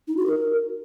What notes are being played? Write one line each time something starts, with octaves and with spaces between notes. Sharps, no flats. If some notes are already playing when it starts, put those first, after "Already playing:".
D#4
F#4
A#4